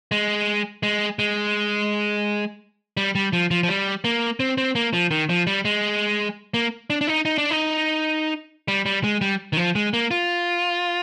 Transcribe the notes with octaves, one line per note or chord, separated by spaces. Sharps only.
G#3
G#3
G#3
G3
G3
F3
F3
F3
G3
A#3
C4
C4
A#3
F3
D#3
F3
G3
G#3
A#3
D4
D4
D#4
D#4
D4
D#4
G3
G3
G#3
G3
D#3
F3
G#3
A#3
F4